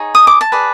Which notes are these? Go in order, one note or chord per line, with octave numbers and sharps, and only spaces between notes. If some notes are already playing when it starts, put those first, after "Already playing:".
Already playing: D#4 G#4 C#5
D#6
D6
A5
G#4 B4 D5